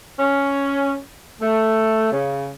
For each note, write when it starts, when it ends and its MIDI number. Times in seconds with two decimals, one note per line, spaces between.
0.19 0.99 61
1.41 2.12 57
2.12 2.50 49